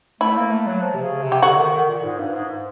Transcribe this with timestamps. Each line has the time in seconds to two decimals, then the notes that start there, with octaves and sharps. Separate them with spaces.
0.21 A3 E4
0.36 A#3
0.51 A3
0.67 F#3
0.82 F3
0.94 C3
1.02 C#3
1.23 C3
1.32 G4
1.42 D3 F#4
1.58 D#3
1.73 D#3
1.89 A#2
2.04 G#2
2.19 G2
2.34 G#2